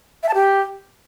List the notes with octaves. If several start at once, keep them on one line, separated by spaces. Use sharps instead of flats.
E5
A5
G4